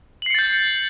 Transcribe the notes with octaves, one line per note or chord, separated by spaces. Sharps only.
G6 A6 C7 C#7 F#7